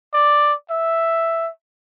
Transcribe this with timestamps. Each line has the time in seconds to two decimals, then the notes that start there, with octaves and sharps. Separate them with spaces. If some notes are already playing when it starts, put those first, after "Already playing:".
0.14 D5
0.70 E5